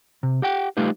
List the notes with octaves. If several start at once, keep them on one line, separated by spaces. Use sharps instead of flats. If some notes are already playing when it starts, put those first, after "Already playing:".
C3
G4 F#5 G5
G3 A3 D#4 F4 G4 B4